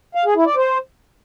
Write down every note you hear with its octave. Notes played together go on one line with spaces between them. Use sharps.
F5
G#4
E4
D5
C5